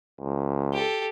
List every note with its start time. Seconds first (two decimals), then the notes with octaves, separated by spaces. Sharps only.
0.20 C#2
0.73 G4 A4